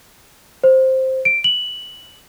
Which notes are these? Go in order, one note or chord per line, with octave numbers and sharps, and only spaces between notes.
C5
D7
F#7